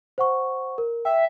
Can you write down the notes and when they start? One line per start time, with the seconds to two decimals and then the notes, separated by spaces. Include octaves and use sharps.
0.18 C5 F#5 C#6
0.78 A#4
1.05 E5 G5